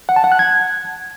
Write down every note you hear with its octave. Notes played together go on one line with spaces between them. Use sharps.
F#5
A5
F#5
F#6
G#6